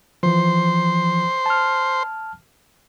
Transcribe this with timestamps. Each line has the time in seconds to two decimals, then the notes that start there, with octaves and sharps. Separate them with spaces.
0.23 E3 F3 C5
1.46 A5 F6